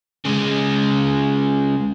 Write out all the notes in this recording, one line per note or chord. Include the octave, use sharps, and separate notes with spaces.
C#3 G#3